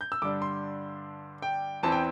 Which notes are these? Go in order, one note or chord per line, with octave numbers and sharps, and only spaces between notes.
G6
E6
G2 D3 G3 D4 D6
C6
G5
E2 E3 C4 A5
G5